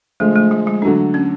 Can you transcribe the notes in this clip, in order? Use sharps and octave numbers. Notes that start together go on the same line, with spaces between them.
D3 F3 G#3 A3
A3
G#3
G#3
D3 F#3 A3 D4
C#4